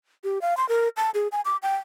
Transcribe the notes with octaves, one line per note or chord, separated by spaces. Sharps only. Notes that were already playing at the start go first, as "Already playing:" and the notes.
G4
F5
C6
A#4
A5
G#4
G#5
D6
G5